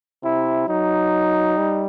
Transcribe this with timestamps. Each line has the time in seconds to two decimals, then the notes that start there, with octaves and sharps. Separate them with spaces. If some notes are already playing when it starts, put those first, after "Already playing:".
0.24 C3 E4
0.68 F#3 D#4
1.57 G3